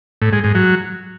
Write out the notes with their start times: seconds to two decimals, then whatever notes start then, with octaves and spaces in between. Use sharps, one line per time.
0.22 A2
0.33 G#3
0.44 G#2
0.55 F#3